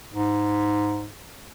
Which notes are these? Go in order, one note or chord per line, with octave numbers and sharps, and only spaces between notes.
G#2